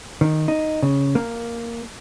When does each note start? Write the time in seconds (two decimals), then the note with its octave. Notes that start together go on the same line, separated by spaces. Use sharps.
0.21 D#3
0.48 D#4
0.83 C#3
1.15 A#3